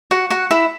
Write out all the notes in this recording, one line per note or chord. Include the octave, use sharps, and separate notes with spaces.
F#4 F#5
F#4 F#5
E4 E5